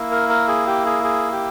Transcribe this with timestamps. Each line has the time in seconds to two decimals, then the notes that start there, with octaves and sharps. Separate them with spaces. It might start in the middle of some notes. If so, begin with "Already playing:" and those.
Already playing: A#3 E4
0.11 A#4
0.29 A#4
0.48 G#4
0.67 G4
0.85 G#4
1.04 G#4
1.32 G4